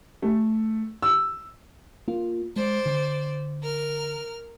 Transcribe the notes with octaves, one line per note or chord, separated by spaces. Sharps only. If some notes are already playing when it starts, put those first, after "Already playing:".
A3
E6
A#3 F4
G#3 C5 D5
D3
A#4 F6